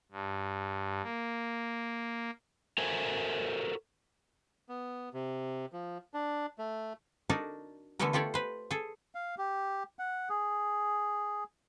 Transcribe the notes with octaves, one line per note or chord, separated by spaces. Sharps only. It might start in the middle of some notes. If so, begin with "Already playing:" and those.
G2
A#3
F#4 A4 A#4 C5 E5 G#5
B3
C3
F3
D4
A3
D4 D#4 F#4 A#4 D5
D3 E3 A3 B3 A4 A#4
F4 G4 A4 C#5 D5
B4 C5
G#4 A4
F5
G4
F#5
G#4